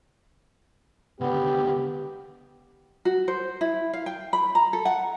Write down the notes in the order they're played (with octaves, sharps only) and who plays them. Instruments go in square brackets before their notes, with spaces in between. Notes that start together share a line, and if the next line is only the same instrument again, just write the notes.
[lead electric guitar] C#2 D3 [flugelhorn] B3 [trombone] G4
[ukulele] F#4
C5
E4
F5
G5
B5
A#5
A4
F#5